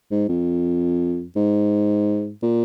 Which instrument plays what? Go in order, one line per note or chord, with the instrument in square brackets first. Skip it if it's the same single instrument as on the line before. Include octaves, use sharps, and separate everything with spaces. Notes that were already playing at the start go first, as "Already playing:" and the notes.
[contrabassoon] G#2
F2
G#2
A#2